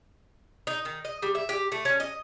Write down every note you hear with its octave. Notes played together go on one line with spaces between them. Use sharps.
D#4
D#3
D#5
G3
E5
G4
A3
C#4
D#5